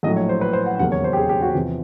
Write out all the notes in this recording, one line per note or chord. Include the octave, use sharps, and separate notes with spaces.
A#1 A2 F#3 A3 D#5
C#5
C5
B4
C5
F#5
E1 D#2 C#3 F#3 A#3 F#5
C#5
C5
G4
G#4
G4
F#4
E2 C3 F3